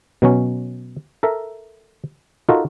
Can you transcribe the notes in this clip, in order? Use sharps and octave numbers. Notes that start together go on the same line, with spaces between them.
B2 F#3 C#4
A4 A#4 E5
D#4 F4 F#4 A4 A#4